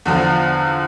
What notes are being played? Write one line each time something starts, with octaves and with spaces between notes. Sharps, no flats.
E2 D3 F3